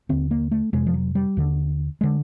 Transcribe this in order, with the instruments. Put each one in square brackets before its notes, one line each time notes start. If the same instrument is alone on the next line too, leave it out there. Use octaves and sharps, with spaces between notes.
[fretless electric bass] D#2 D3 C4
A#3
A3
F2 C3 G#3
F3
F#3
G3
D#2 D3
D3 G#3